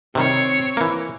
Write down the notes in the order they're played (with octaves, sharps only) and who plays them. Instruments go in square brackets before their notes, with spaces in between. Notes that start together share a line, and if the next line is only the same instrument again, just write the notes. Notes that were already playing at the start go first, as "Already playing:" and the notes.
[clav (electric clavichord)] C3 D#3 G3 [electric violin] C4 C#5
[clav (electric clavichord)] E3 A#3